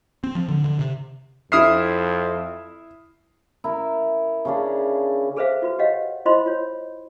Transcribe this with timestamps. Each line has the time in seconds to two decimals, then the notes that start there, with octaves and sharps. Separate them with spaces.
0.24 C4
0.35 F3
0.49 D3
0.64 D3
0.79 C3
1.52 F2 E4 E5 D#6 F6 C7
3.64 E4 A#4
4.45 C#3 C#4 D4
5.37 G#4 A4 B4 C5 E5 F5
5.62 F4 F#4 B4
5.79 G4 C#5 D#5 F5 F#5
6.26 E4 F4 C5 D#5 B5 C6
6.46 F4 C#5